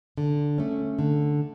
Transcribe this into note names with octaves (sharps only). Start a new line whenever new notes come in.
D3
A3 C#4
D3